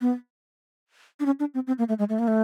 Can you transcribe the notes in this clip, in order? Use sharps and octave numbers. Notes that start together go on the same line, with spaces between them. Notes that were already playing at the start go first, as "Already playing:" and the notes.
B3
D4
C#4
D4
C4
C4
A#3
A3
G#3
A3
A#3
A3